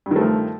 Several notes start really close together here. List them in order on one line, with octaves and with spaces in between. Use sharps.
G2 D#3 A3 F3